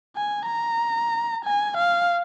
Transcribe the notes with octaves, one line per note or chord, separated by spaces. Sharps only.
G#5
A#5
G#5
F5